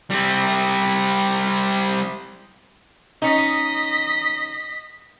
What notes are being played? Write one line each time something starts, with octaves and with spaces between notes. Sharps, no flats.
G3 C4
C#4 D#4 D#5 B6